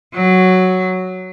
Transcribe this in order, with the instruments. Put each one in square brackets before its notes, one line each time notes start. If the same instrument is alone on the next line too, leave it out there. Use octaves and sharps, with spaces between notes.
[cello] F#3